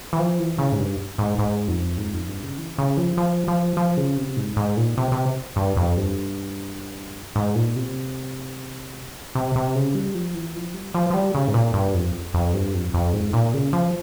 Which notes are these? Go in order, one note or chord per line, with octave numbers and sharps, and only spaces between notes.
E3
F3
E3
C#3
G#2
G2
G#2
G#2
F2
G#2
F2
G2
C#3
E3
C#3
F3
F3
F3
F3
C#3
C3
G#2
G#2
A#2
C3
C3
G2
F2
G2
G#2
A#2
C3
C3
C3
C#3
G3
F3
E3
F3
G3
F3
F3
G3
C#3
G#2
A#2
G2
F2
F2
G2
F2
F2
G#2
A#2
C#3
F3